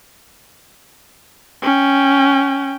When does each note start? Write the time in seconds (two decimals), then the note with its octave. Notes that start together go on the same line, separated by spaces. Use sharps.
1.62 C#4 G5